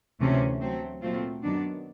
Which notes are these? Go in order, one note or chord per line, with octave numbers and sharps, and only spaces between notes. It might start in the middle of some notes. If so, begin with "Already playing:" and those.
D2 C3 E3 A3 C#4
F#3 A3 C4
A#2 F#3 A3 C4 F4
F#2 D#3 F#3 B3 D4